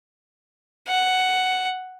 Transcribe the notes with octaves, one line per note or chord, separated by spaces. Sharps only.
F#5